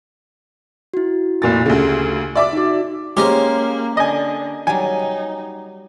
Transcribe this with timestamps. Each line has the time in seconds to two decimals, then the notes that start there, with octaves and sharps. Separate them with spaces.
0.94 E4 F#4
1.42 F1 A#2 A6
1.66 D2 C#3 F4 G4
2.35 D5 E5 D6
2.53 D#4 F#4
3.17 G#3 A#3 C#4 G4 A#4 C5
3.97 D3 D#5 G#5
4.67 F#3 G3 D#4 G#5